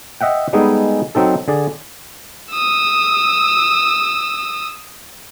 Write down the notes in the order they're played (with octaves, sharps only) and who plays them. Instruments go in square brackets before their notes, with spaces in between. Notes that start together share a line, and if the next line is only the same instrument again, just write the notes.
[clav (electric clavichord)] D#5 E5 F#5 G5
G3 G#3 B3 D#4 G#4 A4
F#3 C4 D#4 A4
D3 G#4 D5
[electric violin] D#6 E6